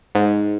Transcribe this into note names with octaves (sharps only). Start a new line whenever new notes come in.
G#2